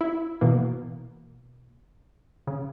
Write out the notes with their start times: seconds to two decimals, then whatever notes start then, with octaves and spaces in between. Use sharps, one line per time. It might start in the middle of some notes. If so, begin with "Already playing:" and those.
0.01 E4
0.41 B2 E3 A#3
2.47 C#3